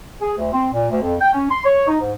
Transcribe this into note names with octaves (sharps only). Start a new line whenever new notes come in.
G#4
D2
C4
A#2
D2
F2
G5
C#4
C6
C#5
D#4
G#2